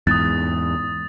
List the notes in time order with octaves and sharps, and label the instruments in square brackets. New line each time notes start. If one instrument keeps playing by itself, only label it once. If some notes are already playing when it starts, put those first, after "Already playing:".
[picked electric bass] E2 G#2 [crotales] D#6 A6